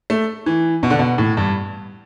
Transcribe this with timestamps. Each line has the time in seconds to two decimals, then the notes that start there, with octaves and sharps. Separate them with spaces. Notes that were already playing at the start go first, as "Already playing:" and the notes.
0.10 A3
0.46 E3
0.83 B2
0.90 D3
0.99 B2
1.18 A2
1.37 G2